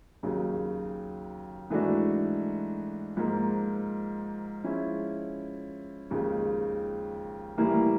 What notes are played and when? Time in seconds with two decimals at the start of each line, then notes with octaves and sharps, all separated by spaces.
0.23 D#2 C#3 F#3
1.70 G#2 E3 A3 D4 F#4
3.17 G#2 F3 A#3
4.64 F3 G#3 C#4 E4
6.11 D#2 C#3 F3 G#3
7.58 A2 E3 G3 A#3